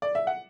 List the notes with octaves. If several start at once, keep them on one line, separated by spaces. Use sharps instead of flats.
D5
E5
F#5